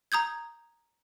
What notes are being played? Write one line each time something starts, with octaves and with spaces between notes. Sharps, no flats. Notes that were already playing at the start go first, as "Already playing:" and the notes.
A#5 D#6 G6 G#6